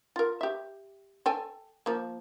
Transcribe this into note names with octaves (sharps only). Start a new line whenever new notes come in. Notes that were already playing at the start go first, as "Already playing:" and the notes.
F4 A#4
G4 E5
A4 G5 G#5
F3 A#3